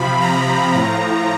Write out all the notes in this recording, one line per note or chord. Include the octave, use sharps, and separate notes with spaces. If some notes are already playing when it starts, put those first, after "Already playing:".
Already playing: C3 F3 B5
A#5
A2 F3 A#5